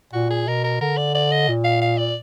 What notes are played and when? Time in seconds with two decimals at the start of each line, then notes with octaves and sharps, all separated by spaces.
0.13 A#2 F#4
0.30 G#4
0.47 B2 A#4
0.64 A#4
0.81 D3 A#4
0.97 D5
1.15 D5
1.32 D#5
1.48 A#2
1.64 F5
1.81 F5
1.98 D5